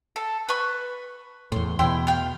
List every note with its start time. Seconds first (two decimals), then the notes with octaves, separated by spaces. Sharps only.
0.16 A4
0.49 B4 C#6
1.52 E2 A2 C6
1.79 E2 B2 E4 G5 C6
2.07 F5 G5